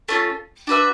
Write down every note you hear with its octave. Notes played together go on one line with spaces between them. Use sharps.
A3 C#4 F4
D4 F#4 B4 E5